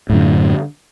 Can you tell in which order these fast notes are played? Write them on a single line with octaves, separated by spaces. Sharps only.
A2 F#2 D3